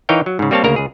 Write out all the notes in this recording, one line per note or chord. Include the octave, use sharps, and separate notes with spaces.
E3 D#4 A#4 C#5 F5 G5
F#3
G#2 C#3
G3 A#3 C4 C#5 F5 A5
D2 C#3 A#3 A#4 A#5
C#2 G#4